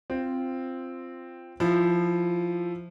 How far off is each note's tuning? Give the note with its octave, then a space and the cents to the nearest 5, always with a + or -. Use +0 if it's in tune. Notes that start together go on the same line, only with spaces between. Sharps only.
C4 +0 F4 -10
F3 +0 E4 +10